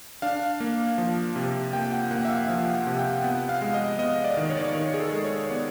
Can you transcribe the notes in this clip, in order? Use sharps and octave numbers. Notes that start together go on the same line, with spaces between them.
D4 F5
A#3
F3
C3
A#3 G5
F#5
A#3 F#5
E5
F5
F3 F5
F#5
C3
G5
B3 F#5
F5
G#3
D#5
B3 D#5
D5
D#3
C#5
D5
C#5
D#3
G#4
A4
G#3
C#5
B3 D5